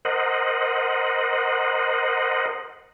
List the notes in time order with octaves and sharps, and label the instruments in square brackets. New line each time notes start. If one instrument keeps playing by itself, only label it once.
[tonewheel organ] A#4 C5 D#5 F#5